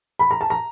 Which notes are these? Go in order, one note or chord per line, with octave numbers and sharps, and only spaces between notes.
B5
A#5
A5
A#5